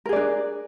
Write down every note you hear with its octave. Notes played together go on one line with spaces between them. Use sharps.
D4 G#4 A#4 D5